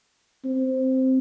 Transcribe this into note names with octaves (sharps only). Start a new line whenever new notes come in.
C4